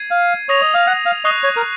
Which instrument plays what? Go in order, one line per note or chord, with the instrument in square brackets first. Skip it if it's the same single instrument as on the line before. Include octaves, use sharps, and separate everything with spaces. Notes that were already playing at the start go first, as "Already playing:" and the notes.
Already playing: [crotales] G#6 C7 D#7
[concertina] F5
[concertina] C#5 [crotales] D#6 A#6 F7
[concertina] D#5
F5
F#5
F5
[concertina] D#5 [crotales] C#6 F#6 C7 F7
[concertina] C#5
A#4